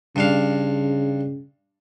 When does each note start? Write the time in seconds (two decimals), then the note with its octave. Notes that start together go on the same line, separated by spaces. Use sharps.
0.16 G2 C#3 D4 F5